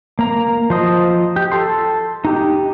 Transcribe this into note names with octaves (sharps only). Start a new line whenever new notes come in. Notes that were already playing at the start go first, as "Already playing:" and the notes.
A#3 A#5
F3 C5 D#5
G4
A4 C6
D#4 G4